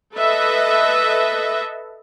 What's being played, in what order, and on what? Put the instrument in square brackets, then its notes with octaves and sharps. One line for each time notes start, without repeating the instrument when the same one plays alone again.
[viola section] A4 B4 D#5 E5